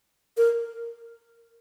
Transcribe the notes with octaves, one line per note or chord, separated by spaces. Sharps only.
A#4